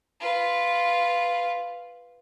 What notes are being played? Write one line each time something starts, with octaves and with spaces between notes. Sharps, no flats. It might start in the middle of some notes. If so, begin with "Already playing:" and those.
F4 B4